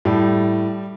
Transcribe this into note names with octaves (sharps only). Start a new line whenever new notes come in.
A2 G3